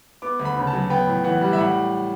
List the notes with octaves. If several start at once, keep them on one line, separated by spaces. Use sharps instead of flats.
B3 D6
D2
B5
C#3
A5
F#3
B3 G5
A2
E3 F#5
G3
E5
A2 F#5